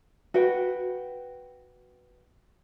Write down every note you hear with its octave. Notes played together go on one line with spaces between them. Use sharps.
F#4 B4 G5